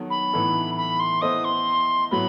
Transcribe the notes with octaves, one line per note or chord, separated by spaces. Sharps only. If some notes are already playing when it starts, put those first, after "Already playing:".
Already playing: D#3 F#3 B3 A4
B5
A2 E3 B3 D#4 A4
B5
C6
B3 E4 A4 C5 D#5 D#6
C6
A2 F#3 B3 B5